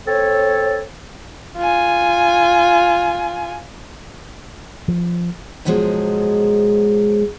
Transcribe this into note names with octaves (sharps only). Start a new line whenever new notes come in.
C4 A4 C#5
F4 G#5
F3
G#2 B2 F3 F#3 G#3